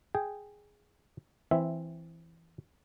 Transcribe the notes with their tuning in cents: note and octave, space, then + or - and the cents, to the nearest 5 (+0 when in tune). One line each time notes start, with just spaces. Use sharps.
G#4 +0 G5 +0
E3 +5 C4 +0 E5 -5